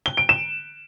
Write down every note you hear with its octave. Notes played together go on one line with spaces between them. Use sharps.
G7
D7
E7